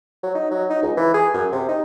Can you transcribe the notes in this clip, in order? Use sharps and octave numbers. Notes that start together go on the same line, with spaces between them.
F#3
D#4
F#3
D#4
C#2
E3
G#4
F#2
C3
D#4